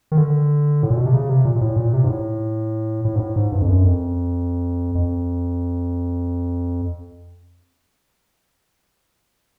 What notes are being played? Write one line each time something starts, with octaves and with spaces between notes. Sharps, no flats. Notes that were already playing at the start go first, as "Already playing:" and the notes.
D#3
D3
A2
A#2
B2
C3
C#3
C3
A#2
A#2
A2
A#2
C3
G#2
A2
A2
G#2
A2
G#2
G2
F2
F#2
F2
F2